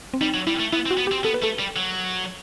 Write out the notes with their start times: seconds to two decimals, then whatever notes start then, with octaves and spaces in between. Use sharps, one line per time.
0.14 C4
0.21 G3 D#4
0.34 F#3
0.47 G3 E4
0.60 A3
0.73 B3 E4
0.86 C4
0.91 F#4
0.98 B3
1.07 C4 G4
1.24 B3 A4
1.34 B4
1.42 A3 A4
1.59 G3
1.76 F#3